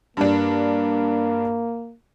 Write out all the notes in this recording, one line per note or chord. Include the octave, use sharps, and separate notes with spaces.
G2 A#3 D4